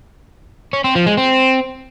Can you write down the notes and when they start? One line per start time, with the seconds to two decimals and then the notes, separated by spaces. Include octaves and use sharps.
0.73 C#4
0.84 C4
0.95 F3
1.06 G#3
1.17 C4